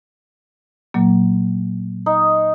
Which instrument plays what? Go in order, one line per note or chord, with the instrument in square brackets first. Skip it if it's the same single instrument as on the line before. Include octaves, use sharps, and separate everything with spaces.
[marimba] A#2 F#3 A#3
[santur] D#4